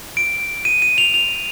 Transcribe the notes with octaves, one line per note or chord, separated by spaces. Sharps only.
D7
D#7
D#7
F7
F7